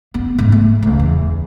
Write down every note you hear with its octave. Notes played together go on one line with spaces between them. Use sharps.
B3
G#2
A3
C#2
E2